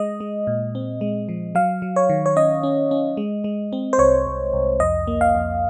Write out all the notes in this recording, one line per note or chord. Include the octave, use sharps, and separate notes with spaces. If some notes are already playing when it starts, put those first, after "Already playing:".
Already playing: G#3 D#5
G#3
A#2
C4
G#3
F3
F#3 F5
F#3
C#5
D#3
C#5
C#4 D#5
C#4
C#4
G#3
G#3
C4
C5
C2 C#5
C2
C2
F2 D#5
A#3
F5
F2